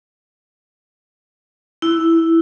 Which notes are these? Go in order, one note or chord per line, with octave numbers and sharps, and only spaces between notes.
E4